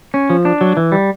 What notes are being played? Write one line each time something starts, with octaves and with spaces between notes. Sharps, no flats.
C#4
F3
D4
F#3
E3
G3